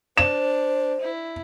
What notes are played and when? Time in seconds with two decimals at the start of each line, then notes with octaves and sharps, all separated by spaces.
0.17 D4 C5 E7
1.00 E4